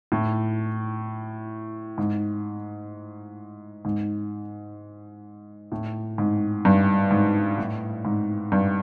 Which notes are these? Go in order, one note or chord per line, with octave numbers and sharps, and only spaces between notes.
A2
G#2
G#2
A2
G#2
G2
G#2
A2
G#2
G2